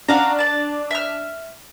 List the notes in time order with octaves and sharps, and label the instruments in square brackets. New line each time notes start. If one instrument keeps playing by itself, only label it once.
[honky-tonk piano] D4 [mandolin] F#4 F5 A#5
[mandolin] D5 A5
E5 F6